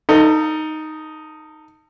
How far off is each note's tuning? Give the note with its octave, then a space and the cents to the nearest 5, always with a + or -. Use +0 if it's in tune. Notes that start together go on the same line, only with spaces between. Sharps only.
D#4 +0 A4 +30